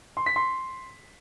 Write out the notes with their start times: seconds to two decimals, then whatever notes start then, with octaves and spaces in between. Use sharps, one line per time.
0.17 C6
0.26 B6
0.36 C6